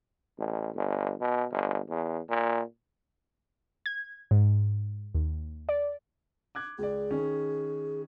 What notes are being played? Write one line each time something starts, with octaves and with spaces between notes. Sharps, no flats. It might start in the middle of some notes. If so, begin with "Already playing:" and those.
A1
G1
B2
G1
E2
A#2
G#6
G#2
D#2
D5
D6 F#6 G#6
C#2 G#4 D5
D#3 C#4